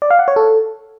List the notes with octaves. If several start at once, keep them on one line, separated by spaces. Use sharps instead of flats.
D5
F5
F#5
C#5
A4